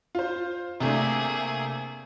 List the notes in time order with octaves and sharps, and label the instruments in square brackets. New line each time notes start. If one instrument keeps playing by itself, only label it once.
[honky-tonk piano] F4 C5
[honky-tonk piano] C3 A3 D4 [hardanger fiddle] A#3 G#4